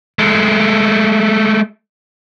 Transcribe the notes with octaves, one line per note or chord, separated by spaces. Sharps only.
G#3 A3